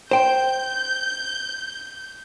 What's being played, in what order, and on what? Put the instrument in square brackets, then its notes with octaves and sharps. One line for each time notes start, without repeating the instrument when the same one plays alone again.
[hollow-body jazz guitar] C5 G5 [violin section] G6